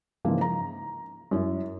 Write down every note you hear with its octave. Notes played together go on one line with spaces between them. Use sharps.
G#2 C#3 E3 F3 A#3
A#5
F#2 E4